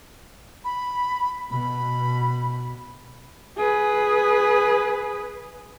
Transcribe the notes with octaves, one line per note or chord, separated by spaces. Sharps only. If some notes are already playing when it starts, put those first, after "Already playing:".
B5
B2 B5
G#4 B4